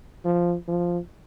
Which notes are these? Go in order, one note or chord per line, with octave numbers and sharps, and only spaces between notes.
F3
F3